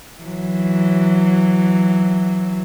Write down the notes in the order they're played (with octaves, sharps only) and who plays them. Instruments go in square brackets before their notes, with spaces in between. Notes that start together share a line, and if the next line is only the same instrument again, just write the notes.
[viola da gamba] E3 F#3